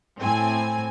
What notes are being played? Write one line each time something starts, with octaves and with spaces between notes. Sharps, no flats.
A2 C4 G#5